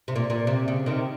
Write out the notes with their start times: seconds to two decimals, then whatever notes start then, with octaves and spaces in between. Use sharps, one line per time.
0.08 C3
0.16 A#2
0.30 A#2
0.47 C3
0.68 C#3
0.86 C3 D#3